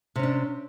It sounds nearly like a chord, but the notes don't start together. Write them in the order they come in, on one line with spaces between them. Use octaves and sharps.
C3 C#4 D4